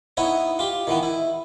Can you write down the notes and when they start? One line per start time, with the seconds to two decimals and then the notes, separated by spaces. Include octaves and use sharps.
0.17 B3 D#4 E4 C#5
0.59 F4 G4
0.87 D#3 E3 B3
1.03 E4